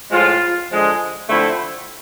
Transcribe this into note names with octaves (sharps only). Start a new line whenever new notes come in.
A2 F3 G#3 F4
D3 F3 G#3
D3 F3 A3 C4 E4